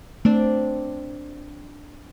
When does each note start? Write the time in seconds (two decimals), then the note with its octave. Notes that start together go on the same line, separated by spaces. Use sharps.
0.25 A3 C4 D4